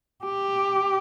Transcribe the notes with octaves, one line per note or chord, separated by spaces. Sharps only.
G4